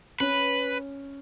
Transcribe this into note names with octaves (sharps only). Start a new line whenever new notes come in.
C#4 B4